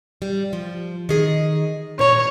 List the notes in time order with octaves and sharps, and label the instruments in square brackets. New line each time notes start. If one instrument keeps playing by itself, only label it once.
[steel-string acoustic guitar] G3
F3
D#3 G#4 D#5
[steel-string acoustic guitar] A#2 A#5 [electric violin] C#5